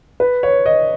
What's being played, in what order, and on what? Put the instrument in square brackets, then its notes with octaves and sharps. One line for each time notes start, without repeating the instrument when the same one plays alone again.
[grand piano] B4
C#5
D#5